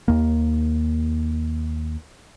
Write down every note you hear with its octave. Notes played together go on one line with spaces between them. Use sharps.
D#2 A#3